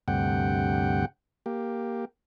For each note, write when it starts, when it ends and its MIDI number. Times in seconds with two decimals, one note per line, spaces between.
0.08 1.05 38
0.08 1.05 43
0.08 1.05 48
0.08 1.05 78
0.08 1.05 79
1.46 2.05 58
1.46 2.05 67